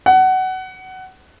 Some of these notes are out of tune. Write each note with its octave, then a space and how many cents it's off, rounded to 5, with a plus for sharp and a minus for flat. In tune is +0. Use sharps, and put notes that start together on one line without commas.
F#5 +20